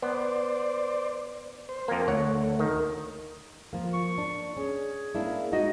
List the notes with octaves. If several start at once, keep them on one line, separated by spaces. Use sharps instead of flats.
B3 C5 D5
C5
F2 A#3
D2 A3 C#5 F#5
D#3
F3 A#3 F4
C#6
D4
C#4 G#4
A#3 D4 E4
G#3 D#4 F#4 D#5